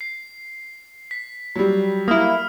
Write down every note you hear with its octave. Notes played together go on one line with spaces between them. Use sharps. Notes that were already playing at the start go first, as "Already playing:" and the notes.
C7
B6
F#3 G3
A#3 E4 D#6 F6